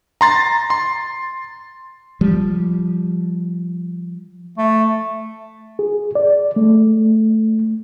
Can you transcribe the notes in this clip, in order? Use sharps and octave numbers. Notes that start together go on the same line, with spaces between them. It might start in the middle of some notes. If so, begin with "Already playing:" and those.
A#5 C6 A6
C6
F3 G3
A3
G#4
D5
A3